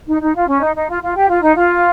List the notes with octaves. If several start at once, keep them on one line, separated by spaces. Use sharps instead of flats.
D#4
D#4
F4
C#4
D#4
D#4
F4
F4
G4
F4
D#4
F4